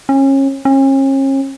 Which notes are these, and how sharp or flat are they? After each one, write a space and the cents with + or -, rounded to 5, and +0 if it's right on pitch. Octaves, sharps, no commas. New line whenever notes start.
C#4 -30
C#4 -40